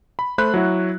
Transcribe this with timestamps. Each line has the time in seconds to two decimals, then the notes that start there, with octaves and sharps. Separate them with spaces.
0.19 B5
0.38 A3 C5 B5 F#6
0.54 F#3 E4 F#4